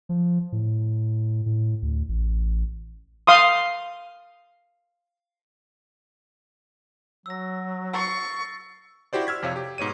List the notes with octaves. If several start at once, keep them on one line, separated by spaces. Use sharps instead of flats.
F3
A2
A2
D2
A1
F5 C6 D#6
F#3 E6 A#6
C#6 E6 A6 C7
E4 F#4 G4 C5 D5
E6 F6 G#6 B6
F2 C3 C#5 F5
G4
G#2 B2 C#5 D#7